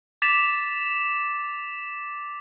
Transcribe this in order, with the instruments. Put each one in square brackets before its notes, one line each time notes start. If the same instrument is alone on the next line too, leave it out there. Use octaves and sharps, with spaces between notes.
[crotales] D6 A6 B6 E7 F7